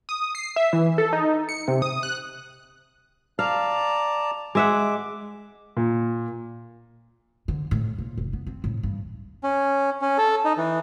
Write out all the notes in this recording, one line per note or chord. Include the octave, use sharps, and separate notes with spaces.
D#6
C7
E5
E3
A4
D#4
C#7
C3
D#6
F#6
D5 F5 A5 A#5
G#3 E5 F#5 D6
A#2
D3
A2
A#2
F1
B3
C4
A2
G2
C#4
C#4
A4
D#4
E3